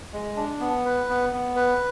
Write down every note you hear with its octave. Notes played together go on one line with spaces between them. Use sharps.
G#3
D4
B3
B4
B3
B3
B4